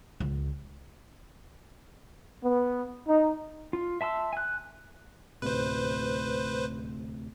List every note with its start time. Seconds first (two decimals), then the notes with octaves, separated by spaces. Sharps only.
0.20 C#2
2.43 B3
3.07 D#4
3.73 F4
4.01 E5 A5 C6 E6
4.33 G#5 F#6
5.42 D2 A2 C3 B4 C5